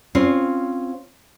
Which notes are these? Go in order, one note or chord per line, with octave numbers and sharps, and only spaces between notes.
C4 C#4 F4